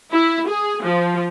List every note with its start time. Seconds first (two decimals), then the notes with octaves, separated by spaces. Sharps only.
0.12 E4
0.48 G#4
0.82 F3